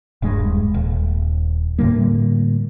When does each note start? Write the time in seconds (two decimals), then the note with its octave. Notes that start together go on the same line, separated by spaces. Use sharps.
0.22 D#1 G2 G#3
0.74 D#1
1.78 A2 D3 G3 A#3